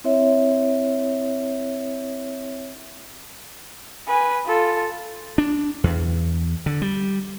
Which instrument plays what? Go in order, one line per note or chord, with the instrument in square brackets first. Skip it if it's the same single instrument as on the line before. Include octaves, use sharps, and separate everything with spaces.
[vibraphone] C4 E4 C#5 E5
[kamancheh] B4 G#5
F4 A4
[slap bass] D4
E2
D3
G3